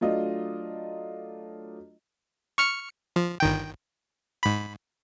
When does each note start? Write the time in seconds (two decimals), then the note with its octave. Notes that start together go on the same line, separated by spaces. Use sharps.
0.01 F#3 A3 D4 F4 D#5
2.58 C#6 F6 C#7
3.16 F3
3.40 G1 D#3 G5
4.43 G#2 B5